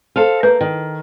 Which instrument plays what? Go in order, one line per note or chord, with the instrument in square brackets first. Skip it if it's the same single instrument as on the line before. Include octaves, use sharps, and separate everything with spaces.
[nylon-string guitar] A4 C5 F5
[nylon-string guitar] A#3 [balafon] B4
[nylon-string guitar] D#3